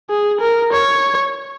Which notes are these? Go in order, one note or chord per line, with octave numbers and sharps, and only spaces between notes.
G#4
A#4
C#5